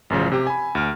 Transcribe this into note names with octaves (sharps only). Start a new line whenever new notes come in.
A1 F#2 C#3 F3
C3 G4
G#5 B5
D2 F6